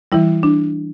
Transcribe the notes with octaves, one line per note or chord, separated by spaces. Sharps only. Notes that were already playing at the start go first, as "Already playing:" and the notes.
E3 G3 E4
D4